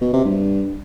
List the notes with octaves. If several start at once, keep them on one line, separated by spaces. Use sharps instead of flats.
B2
C3
G2